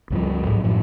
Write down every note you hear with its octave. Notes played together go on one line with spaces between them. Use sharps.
C#2 G2 F3
A1 G#2 F#3
F#2 A2 F3